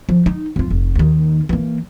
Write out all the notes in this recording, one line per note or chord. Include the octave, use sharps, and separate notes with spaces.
F3
D#4
F2 F4
F1
D#2 D#3
E3 A#3